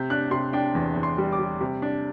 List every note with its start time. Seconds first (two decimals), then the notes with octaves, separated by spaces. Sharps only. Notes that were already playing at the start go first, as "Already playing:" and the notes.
Already playing: C3 G6
0.10 D4 F#6
0.31 C3 C6
0.53 D4 G5
0.75 E2
0.96 E2
1.03 C6
1.18 G3
1.32 D6
1.39 G3
1.61 C3
1.82 D4